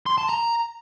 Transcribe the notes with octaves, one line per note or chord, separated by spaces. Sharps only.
C6
A5
A#5